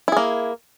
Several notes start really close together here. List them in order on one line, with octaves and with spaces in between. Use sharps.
E4 G#4 A#3